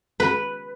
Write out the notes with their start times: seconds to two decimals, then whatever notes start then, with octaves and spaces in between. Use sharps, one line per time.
0.20 B4